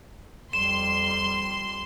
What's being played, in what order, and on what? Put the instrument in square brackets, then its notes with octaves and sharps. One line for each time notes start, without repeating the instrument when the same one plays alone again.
[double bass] F2 G3 [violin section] C6 [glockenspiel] E7